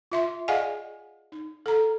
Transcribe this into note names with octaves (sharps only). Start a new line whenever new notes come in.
F4 E5 C6
G#4 D5 D#5 F5 F#5 G#5
D#4
A4 A#5